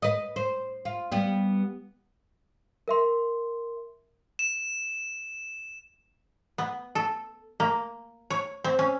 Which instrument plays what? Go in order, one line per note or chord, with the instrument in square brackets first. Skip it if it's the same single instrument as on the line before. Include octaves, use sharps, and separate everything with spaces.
[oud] B4 D#5
C5
F4
G3 B3
[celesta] A#4 E5 C6
[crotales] E7
[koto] B3
A4
A#3
C#5
C4
C#4